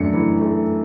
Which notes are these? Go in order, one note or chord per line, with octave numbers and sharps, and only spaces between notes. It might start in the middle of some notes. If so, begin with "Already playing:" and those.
Already playing: F#2 A3 D4 C#7
E3
A3